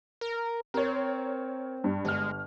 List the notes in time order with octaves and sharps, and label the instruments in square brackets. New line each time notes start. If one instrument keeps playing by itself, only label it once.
[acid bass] A#4
[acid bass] C4 [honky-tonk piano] A#4 C#5
[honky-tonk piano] G2
[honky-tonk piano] G1 F6 [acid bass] G#3